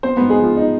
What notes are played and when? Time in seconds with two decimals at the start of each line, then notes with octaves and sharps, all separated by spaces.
0.03 B3 C4 C5
0.17 G#2 B3 B4
0.30 G#3 G#4
0.39 F3 F4
0.57 D#4